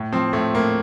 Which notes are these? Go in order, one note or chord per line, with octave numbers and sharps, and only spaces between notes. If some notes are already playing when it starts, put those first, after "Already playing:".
Already playing: A2
F3 C4
A2 A3
A2 A#3